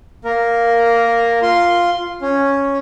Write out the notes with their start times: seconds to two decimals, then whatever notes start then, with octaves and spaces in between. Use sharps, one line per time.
0.25 A#3 A#4
1.42 F4 C6
2.22 C#4